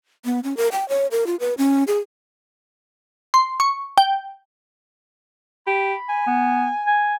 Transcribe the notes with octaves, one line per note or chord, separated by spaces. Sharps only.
B3
C#4
A#4
G5
C#5
A#4
F4
B4
C#4
G#4
C6
C#6
G5
G4 B5
G#5
B3
G#5